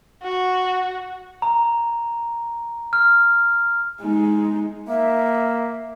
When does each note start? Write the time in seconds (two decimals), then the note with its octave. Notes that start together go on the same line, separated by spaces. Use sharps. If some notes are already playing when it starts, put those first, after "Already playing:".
0.23 F#4
1.42 A#5
2.93 F6
4.02 G#3 D#4
4.88 A#3 E5